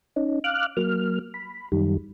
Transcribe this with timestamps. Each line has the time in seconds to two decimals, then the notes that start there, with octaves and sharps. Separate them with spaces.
0.16 C#4 D#4
0.44 F5 D6 F6 F#6
0.77 F#3 A#3 F6
1.34 B5
1.72 F#2 D#3 G3